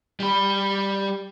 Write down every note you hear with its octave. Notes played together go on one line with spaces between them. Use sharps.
G3 B5